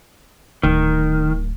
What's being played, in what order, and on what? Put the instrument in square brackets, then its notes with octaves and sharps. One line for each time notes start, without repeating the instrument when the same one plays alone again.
[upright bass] D1 [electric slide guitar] D#3